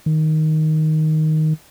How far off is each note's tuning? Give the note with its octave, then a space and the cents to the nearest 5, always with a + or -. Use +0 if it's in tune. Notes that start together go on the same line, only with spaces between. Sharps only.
D#3 +5